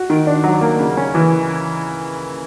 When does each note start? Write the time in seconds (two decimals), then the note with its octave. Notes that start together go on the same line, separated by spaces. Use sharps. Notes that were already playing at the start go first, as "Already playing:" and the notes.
Already playing: F#4
0.10 D#3
0.27 D4
0.44 F#3
0.61 A#3
0.79 C#3
0.97 C#4
1.15 E3